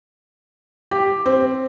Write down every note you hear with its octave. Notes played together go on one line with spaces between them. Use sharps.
G4
C4